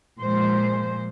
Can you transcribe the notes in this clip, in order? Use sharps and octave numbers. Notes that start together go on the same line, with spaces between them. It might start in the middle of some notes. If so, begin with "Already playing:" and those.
A#2 F3 G#3 C5